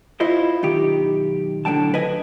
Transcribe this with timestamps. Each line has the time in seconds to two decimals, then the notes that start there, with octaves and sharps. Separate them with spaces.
0.20 E4 F4 C5 D#5 E5
0.63 B1 D#3 G4
1.65 A2 D3 F#3 G5 A5
1.94 B4 D#5 G#5